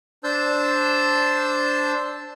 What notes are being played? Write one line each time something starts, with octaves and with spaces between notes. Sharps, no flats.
D4 C5 A5 E6 G6